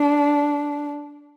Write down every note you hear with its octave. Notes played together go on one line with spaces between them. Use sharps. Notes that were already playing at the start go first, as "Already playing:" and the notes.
Already playing: D4